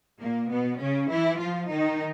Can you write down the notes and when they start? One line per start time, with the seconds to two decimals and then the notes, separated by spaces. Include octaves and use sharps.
0.20 A#2 A#3
0.50 B2 B3
0.80 C#3 C#4
1.10 E3 E4
1.39 F3 F4
1.69 D#3 D#4